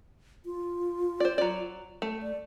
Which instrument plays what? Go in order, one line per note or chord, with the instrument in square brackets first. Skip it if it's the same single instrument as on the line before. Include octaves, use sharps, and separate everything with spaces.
[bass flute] F4
[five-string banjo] C5 D5
F#3 D5
A3
[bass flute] D5